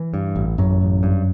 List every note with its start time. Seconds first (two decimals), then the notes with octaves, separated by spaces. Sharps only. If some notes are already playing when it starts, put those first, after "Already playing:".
Already playing: E3
0.14 G2
0.36 A1
0.58 A1 F#2 F#3
0.81 A1
1.03 G2